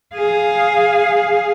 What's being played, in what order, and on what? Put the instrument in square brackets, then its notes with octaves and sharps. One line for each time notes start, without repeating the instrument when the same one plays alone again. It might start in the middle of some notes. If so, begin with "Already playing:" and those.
[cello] G#4 F5